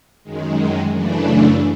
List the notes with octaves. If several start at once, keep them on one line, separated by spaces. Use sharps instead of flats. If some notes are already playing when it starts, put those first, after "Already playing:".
F#2 D#3 G#3
F#2 C#3 E3 A3 D4